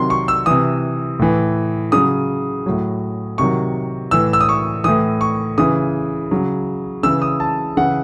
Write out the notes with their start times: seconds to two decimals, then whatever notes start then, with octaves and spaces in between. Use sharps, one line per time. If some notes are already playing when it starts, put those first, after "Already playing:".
Already playing: C3 D#3 F#3 C6
0.10 C#6
0.28 E6
0.46 C3 E3 D#6
1.19 A2 E3
1.92 C#3 F#3 D#6
2.66 A2 F#3
3.38 C3 D#3 F#3 C#6
4.11 A2 E3 E6
4.33 E6
4.41 D#6
4.49 C#6
4.84 A2 E3 D#6
5.21 C#6
5.58 C#3 E3 D#6
6.31 C#3 F#3
7.03 C#3 E3 E6
7.22 D#6
7.40 A5
7.77 C#3 E3 F#5